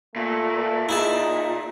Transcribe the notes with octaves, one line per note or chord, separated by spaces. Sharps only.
A#2 A3
D#4 E4 G#4 A5